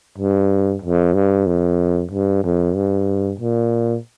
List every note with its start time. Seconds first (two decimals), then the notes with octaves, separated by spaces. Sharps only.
0.18 G2
0.82 F2
1.14 G2
1.47 F2
2.11 G2
2.44 F2
2.75 G2
3.39 A#2